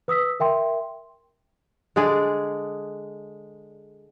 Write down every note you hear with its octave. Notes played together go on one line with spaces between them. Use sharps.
B4 D#6 E6 B6
A#4 E5 G5 C6
D3 G#3 G#4 D5